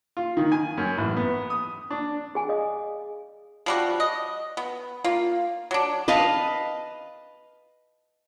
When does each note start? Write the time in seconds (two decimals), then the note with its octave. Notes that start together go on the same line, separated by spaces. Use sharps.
0.17 F4
0.37 D#3
0.52 G#5
0.78 F#2
0.98 A1
1.17 B3
1.50 D#6
1.91 D4
2.35 G#4 G#5
2.49 D#5 F5 D#6
3.66 F3 G3 F#4
4.00 D#5
4.57 B3
5.04 A#3 F4
5.71 F#3 D4
6.08 B4 D#5 F5 A5